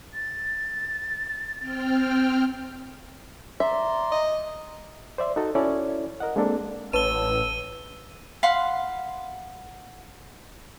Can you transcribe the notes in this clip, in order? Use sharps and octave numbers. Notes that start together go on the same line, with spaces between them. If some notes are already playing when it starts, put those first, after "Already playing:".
A6
C4 G5 F6
D5 E5 A#5 C6
D#5
C5 D5 E5 C6
D#4 F#4 A4
C#4 E4 F#4 A4 C#5 D5
A#4 D#5 F#5
G#3 A#3 C4 D4 A4
A1 B4 C#5 A5 E6 D#7 G7
F5 F#5 B5 C6